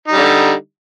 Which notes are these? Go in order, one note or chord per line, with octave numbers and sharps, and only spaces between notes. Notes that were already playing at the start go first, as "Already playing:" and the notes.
D3 G3 D#4